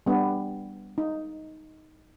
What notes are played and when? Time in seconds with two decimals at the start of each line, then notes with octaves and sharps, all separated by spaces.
0.06 G3 B3 D4
0.98 D#4